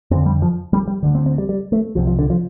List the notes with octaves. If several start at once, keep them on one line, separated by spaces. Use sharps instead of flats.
F2 D3 C4
G3
F3
G3
G3
D2 D3
C4
C4
G3
G3
A3
C2 C3 F3
F3
D3
F3